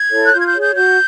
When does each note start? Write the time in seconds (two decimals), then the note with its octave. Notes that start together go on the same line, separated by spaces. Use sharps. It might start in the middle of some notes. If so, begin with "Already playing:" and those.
Already playing: G#6
0.11 E4 A4 C#5
0.25 F#6
0.32 F4 G6
0.40 G#6
0.47 G6
0.54 G#4 C#5
0.61 G6
0.75 F#4 G6